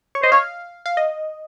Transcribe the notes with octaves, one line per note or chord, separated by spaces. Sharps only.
C#5
C5 D#5
C#5 F5
F5
D#5